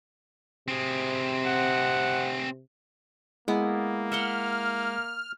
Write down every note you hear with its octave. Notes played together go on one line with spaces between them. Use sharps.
C3 C4 G#4
F#5
G#3 A#3 B3 E4
E5 F#5 C6 F6